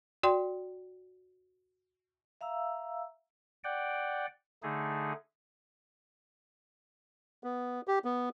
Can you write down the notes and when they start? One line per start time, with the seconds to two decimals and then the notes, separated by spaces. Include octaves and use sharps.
0.23 F#4 D5 G5 C6
2.41 E5 F5 A#5 E6
3.64 D5 F#5 G5
4.63 D3 A3 D#4 G#4
7.44 B3
7.88 G4
8.05 B3